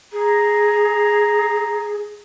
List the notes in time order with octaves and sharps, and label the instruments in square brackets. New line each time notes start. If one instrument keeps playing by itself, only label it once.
[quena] G#4 [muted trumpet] A#5